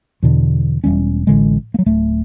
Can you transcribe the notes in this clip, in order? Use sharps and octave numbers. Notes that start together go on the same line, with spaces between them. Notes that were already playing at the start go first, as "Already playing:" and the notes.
E2 B2 D3
E1 E2 G3 C#4
A1 D3 G#3
F#3 A#3
D1 A3